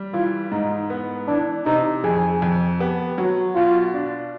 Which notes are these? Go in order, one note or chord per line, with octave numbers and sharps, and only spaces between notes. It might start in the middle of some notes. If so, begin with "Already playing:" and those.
Already playing: G3
E3 F4
G#2 D#4
B3
E3 D4
C3 D#4
F2 G#4
F2
B3 G4
F#3 F#4
B2 F4
D4